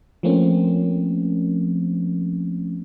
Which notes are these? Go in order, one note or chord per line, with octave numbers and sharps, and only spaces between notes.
F3 A3 A#3 C4 C#4